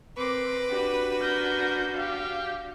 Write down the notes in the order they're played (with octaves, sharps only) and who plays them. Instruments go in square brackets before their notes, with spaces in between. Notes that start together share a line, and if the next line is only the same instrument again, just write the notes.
[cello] C4 A#4 [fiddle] B4 [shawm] D6
[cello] D4 F#4 [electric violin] G4
[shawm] A#4 [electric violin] G6
[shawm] G4 [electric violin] F5